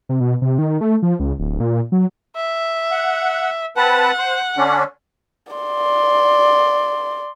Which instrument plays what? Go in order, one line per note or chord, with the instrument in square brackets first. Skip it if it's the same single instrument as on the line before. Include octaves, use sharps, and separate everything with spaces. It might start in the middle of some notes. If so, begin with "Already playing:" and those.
[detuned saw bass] C3
B2
C3
D#3
A3
F3
C#2
D1
A#2
F#3
[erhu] E5
[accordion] F#5
[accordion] C4 B4 A5 [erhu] F#5
[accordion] C5
D3 C#4 D4
[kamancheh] D5 C6